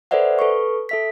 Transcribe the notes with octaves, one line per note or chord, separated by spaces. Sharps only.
A4 B4 C5 D5 E5 F#5
A4 B4 C#6
A4 E5 B6